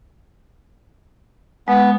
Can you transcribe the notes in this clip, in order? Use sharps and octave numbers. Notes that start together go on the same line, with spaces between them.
G#3 B3